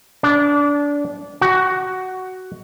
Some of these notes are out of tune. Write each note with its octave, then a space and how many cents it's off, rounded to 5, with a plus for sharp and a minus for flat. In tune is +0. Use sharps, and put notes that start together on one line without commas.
D4 -25
F#4 +10